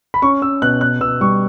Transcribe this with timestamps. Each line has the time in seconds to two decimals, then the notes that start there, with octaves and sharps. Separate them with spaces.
0.14 B5
0.22 C#4 C#6
0.42 C#4 E6
0.62 B2 F#6
0.81 B2 F#6
1.01 B2 E6
1.21 G3 C#6